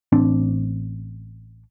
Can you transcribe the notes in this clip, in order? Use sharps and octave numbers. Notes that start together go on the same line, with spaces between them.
A1 C4 D4